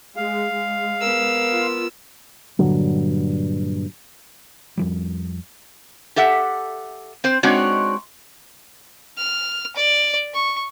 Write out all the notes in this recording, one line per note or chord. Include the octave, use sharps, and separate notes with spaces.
G#3 F5
G#3
B3 A#4 E6
F4
G2 A#2 D3 F#3
F2 F3 G3
G4 A4 E5 F#5
C4 C5
G#3 C4 D4 D#4 F#4 C#5
F6
D5
C#6